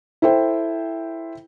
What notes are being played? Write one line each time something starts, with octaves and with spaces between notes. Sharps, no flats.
E4 A4 C5 G5